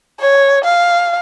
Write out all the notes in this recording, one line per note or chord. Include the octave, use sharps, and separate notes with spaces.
C#5
F5